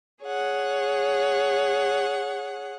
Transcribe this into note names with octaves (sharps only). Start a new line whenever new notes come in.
G#4 C#5 F#5